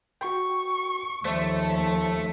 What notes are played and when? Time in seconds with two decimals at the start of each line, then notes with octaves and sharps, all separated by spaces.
0.21 F#4 G5 C#6
1.25 D#2 F3 A3 C5 D5 E5